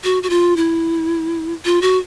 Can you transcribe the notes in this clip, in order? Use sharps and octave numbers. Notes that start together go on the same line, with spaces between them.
F#4
F#4
F4
E4
F4
F#4